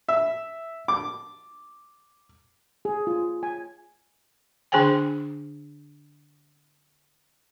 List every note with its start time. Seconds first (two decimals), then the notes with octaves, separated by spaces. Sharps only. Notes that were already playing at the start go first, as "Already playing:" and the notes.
0.09 E5
0.88 D6
2.85 G#4
3.07 F4
3.43 G#5
4.72 D3 D4 G#4 C5 G5 G#5